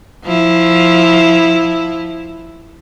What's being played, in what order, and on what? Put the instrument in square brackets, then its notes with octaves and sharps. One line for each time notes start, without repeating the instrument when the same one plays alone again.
[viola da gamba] F3 E4